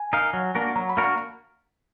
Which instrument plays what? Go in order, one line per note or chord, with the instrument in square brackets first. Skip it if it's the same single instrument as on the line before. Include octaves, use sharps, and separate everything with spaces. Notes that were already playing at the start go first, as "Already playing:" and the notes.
Already playing: [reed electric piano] G#5
[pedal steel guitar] D#4 A#4 F5
F#3
A#3 D4 F#4 A#4
[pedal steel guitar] F#3 [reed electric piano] A#5
[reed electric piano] B5
[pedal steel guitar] A#3 D4 F#4 A#4
[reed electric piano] A#5